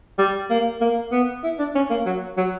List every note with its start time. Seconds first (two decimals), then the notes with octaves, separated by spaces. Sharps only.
0.18 G3
0.50 A#3
0.81 A#3
1.12 B3
1.44 E4
1.59 D4
1.75 C#4
1.90 A#3
2.06 F#3
2.37 F#3